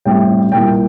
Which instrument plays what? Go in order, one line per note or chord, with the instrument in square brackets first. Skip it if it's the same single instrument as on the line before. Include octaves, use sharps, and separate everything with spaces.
[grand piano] A2 G3 C4 G5
A#2 G3 A#3 E4 G5